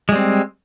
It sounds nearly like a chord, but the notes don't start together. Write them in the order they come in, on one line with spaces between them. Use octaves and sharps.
G#3 G3 C4